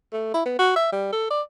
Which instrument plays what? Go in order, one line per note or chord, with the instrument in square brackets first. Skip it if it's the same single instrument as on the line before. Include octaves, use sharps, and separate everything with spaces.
[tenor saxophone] A3
E4
B3
F#4
E5
G3
A4
D5